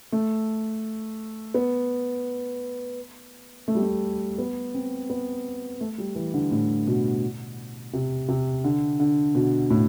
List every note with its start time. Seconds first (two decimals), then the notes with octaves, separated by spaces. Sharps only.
0.12 A3
1.54 B3
3.68 A3
3.75 G3
3.82 A3
4.38 B3
4.74 C4
5.10 B3
5.81 A3
5.98 G3
6.15 E3
6.34 D3
6.51 A2
6.87 B2
7.93 C3
8.28 C3
8.64 D3
9.00 D3
9.35 B2
9.70 A2